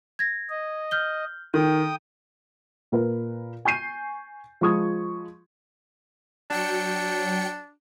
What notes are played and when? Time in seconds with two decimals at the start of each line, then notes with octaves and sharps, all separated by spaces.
0.19 G#6 A#6
0.50 D#5
0.91 F6 G6 G7
1.54 D#3 A4 G5 D#6
2.92 A#2 A#4 B4
3.65 G#5 C#6 G6 C7 D#7
4.61 F3 G#3 B5 C#6 D#6 G#6
6.50 F#3 D4 G5 C#7